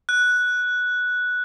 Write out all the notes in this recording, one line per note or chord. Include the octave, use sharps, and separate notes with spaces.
F#6